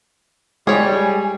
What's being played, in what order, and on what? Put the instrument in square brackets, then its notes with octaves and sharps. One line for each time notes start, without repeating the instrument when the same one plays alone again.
[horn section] G3 [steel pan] G#3 [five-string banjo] G#4 C#5 [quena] G#5